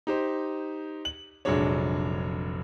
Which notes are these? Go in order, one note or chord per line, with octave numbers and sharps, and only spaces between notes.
D#4 G4 C5
F#7
F1 A#1 F#3 G#3 D4 C#5